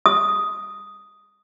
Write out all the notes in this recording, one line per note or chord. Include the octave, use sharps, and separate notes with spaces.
D#6